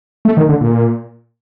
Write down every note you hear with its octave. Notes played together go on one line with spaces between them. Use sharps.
A3
D#3
D3
A#2